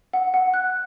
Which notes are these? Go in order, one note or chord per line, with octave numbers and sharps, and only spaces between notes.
F#5
F#5
F#6